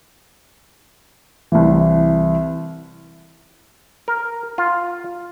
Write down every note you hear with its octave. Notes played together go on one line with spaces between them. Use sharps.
C2 E3
A#4
F4